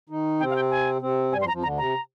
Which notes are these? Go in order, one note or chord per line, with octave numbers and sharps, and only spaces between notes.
D#3 D#4
C3 C4 G5
F5
G5
G#5
C3 C4
G2 G3 G#5
F2 F3 C6
A#5
F2 F3
D2 D3 A#5
C3 A#5